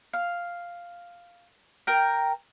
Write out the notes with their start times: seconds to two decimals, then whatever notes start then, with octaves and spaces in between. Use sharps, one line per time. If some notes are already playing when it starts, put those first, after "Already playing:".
0.13 F5
1.87 A#4 G5